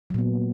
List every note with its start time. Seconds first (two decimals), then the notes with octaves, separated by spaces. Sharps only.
0.10 F#3
0.14 A#2
0.18 B3